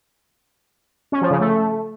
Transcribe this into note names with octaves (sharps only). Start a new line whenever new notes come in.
C#4
F3
C#3
A3